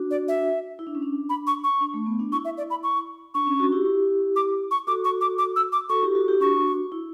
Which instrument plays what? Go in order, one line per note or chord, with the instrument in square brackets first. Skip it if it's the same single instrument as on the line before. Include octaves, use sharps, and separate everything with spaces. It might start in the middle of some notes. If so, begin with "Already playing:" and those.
Already playing: [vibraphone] D4 F#4
[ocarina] D5
E5
[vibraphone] E4
D4
C#4
D4
[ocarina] B5
C#6
C#6
[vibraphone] D4
A3
B3
D4
[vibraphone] E4 [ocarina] C#6
[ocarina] E5
D5
B5
C#6
[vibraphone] D4 [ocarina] C#6
[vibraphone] C#4
D4 F#4
E4 G4
E4 G4
[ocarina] D6
C#6
[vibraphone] F#4 A4 [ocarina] D6
[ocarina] C#6
D6
D6
E6
D6
[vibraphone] F#4 A4 [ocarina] C#6
[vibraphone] E4 G4
F#4 A4
E4 G4
[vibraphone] D4 F#4 [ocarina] C#6
[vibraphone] E4